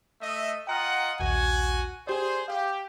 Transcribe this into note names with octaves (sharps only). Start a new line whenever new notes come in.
A3 D#5 E5
F4 D#5 F#5 G5 A#5 F6
A#1 D#2 F#4 G#5
G4 G#4 C5 D5
G4 F5